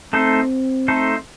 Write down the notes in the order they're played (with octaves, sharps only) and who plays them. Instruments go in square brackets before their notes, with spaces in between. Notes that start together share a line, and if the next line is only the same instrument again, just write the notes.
[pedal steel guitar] A3 D#4 A4 C5 [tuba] C4
[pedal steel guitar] A3 D#4 A4 C5